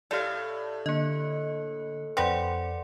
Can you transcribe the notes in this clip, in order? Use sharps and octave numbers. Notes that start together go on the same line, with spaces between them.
A2 G4 A4 D5 F5
D3 A#3 D#5 F#6 C#7
F2 C4 B4 D5 F#5 C6 D6 C#7